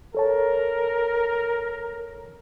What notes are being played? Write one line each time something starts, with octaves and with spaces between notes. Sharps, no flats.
A4 A#4 C#5 A5